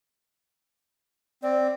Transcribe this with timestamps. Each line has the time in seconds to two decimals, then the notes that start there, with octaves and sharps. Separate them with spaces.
1.43 C4 D5